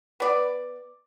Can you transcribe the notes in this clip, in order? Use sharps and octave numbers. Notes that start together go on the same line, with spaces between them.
B3 D5